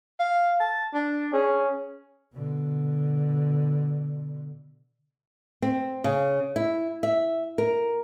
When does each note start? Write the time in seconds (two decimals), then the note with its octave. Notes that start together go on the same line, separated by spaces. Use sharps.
0.19 F5
0.60 A5
0.94 D4
1.33 C#4 G#4
2.33 B2 D3
5.62 C4
6.04 C#3
6.56 E4
7.03 E5
7.58 A#4